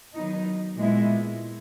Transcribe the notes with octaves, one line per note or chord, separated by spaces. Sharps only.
D#3 F#3 B3 D#4
A#2 G#3 B3 E4